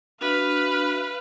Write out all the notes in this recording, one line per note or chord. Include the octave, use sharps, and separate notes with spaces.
D4 F#4 B4 E5 F5